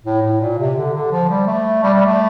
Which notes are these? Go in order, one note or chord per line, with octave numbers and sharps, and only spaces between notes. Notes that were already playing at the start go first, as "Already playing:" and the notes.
A2
A2
A#2
C3
D3
D3
F3
G3
A3
G3
G3
A3